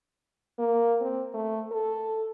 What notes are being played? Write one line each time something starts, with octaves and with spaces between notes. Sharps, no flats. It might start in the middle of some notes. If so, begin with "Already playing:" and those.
A#3
C4
A3
A4